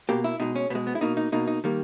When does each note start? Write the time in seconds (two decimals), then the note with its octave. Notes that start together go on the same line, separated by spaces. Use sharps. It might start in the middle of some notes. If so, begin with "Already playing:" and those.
0.09 B2 A#3 G4
0.24 E4
0.40 B2 G#3 D#4
0.55 C#4
0.70 B2 B3
0.75 G#3
0.87 B3
0.95 E4
1.01 B2 A#3 D#4
1.17 D#4
1.32 B2 A#3 D#4
1.48 D#4
1.64 D#3 G3 A#3